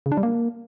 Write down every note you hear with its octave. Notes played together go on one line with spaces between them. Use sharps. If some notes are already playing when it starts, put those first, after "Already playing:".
C#3
D4
G3
A#3